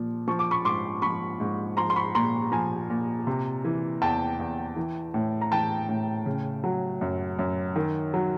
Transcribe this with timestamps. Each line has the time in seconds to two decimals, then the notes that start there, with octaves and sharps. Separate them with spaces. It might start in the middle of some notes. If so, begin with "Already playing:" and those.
Already playing: A#2 F3
0.28 F3 C#6
0.39 D6
0.51 B5 C#6
0.65 G#2 C6 D6
1.02 F3 B5 C#6
1.40 G#2
1.77 F3 A#5 C6
1.90 C6
1.96 B5 C#6
2.15 A#2 A#5 C6
2.52 F3 G#5 A#5
2.90 A#2
3.27 C3
3.65 E3
4.02 E2 G5 A5
4.40 E2
4.76 E3
5.14 A2
5.41 A#5
5.51 E3 G5 A5
5.89 A2
6.26 C#3
6.64 F#3
7.01 F#2
7.39 F#2
7.76 D#3
8.14 F#3